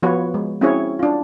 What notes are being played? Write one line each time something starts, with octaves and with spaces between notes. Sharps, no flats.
F3 B3 F4 F#4 B4 C#5
G#3
C4 C#4 E4 F#4 G#4 C#5
D4 F4